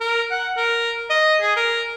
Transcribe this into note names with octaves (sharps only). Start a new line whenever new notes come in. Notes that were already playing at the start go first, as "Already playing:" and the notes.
A#4
F#5
A#4
D#5
G#4
A#4